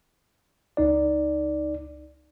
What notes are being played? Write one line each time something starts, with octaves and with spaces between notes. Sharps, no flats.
C#2 D#4 D5